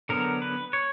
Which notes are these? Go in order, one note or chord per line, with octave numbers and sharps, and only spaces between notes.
D3 F#3 B3 A#4
B4
C#5